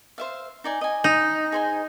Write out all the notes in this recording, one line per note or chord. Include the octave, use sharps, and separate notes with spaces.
C5 E5 F5
D#4 D5 G#5
D#5 G#5
D#4
G#4 C5 G#5